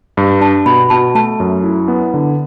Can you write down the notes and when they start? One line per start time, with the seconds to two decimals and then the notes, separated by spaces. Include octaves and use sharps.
0.17 G2
0.41 D4 A5
0.66 B2 B5
0.90 B2 A5
1.15 A3 A5
1.40 F#2
1.64 E4
1.88 B3
2.14 D3